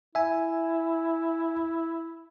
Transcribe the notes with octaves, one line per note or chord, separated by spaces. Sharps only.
E4 E5 G#5